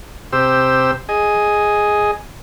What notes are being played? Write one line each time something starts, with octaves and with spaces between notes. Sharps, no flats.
C3 G4 C5 E6
G#4 D#5